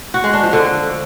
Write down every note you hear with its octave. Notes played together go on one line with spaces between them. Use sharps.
F#4
G#3
D4
F3
D3